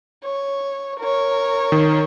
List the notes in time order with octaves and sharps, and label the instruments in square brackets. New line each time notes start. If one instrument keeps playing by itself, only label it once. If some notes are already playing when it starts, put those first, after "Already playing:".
[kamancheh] C#5
A#4 C#5
[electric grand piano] D#3